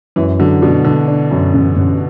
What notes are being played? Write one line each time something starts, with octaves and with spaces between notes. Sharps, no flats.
F#2 E3
D3 F#3
B2 D4
D3 D4
D4
F#2
A1
A1